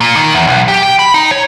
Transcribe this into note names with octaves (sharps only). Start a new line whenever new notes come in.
A#2
D#3
E2
B1
G4
G5
B5
D#4
C#5